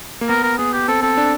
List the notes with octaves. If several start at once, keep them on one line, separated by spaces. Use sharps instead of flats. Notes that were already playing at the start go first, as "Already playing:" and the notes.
A#3
B3 A#4
A#4
B3 G#4
G4
C4 A4
C4 A4
D4